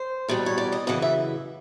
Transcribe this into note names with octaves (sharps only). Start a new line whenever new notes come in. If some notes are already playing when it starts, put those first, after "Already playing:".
Already playing: C5
E2 B2 G3
C#5
D5
D#5
F#2 C#3 E3 D#5
E5